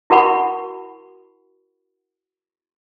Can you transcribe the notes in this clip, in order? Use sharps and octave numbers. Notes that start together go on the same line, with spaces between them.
E4 F#4 A#4 F#5 B5 C#6